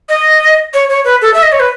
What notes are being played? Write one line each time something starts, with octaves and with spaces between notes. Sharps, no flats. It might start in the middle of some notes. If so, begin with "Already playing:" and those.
D#5
C#5
C#5
B4
A4
E5
D#5
C#5
B4